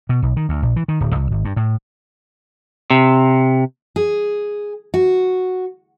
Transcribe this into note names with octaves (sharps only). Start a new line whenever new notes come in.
B2
B1
D#3
D2
A#1
E3
D#3
D1
C2
G#1
G2
A2
C3
G#4
F#4